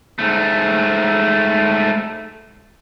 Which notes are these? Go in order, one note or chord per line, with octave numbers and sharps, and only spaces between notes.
G#2 A3